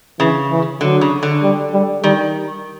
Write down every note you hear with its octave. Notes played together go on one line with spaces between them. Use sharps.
C#3 E3
E3
D3 F#3
C#3
D3
G3
G3
D#3 G3